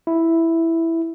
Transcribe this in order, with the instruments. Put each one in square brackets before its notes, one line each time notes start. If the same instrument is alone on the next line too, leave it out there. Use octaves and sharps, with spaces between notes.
[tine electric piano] E4